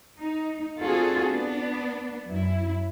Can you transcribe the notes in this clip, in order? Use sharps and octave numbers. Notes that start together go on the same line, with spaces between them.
D#4
C4 D4 F4 F#4 G#4 A4
B3 D4
F#2 E4